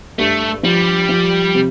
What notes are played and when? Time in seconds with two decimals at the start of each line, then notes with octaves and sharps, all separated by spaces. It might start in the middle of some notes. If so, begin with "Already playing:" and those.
0.18 G2 A3
0.63 F3 G3
1.09 F3
1.55 C3